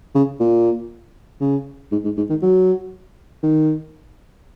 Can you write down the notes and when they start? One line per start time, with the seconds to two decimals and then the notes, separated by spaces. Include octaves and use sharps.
0.15 C#3
0.40 A#2
1.41 C#3
1.92 G#2
2.04 G#2
2.17 G#2
2.30 D#3
2.42 F#3
3.43 D#3